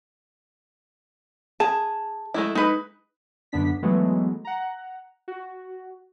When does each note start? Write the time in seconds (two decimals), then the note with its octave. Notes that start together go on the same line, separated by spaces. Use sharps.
1.60 G#4 A5
2.34 G#3 A3 E4
2.55 G#3 D#4 B4
3.52 F#2 D3 B3 D4 B6
3.83 E3 F#3 G#3 A3 B3
4.45 F#5 A#5
5.28 F#4